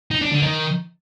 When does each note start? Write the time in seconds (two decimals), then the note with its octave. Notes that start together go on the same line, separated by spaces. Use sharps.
0.11 D#4
0.22 D4
0.32 D3
0.43 D#3